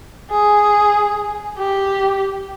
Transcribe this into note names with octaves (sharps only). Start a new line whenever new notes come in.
G#4
G4